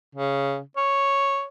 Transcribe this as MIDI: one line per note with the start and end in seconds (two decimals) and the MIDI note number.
0.15 0.60 49
0.77 1.45 73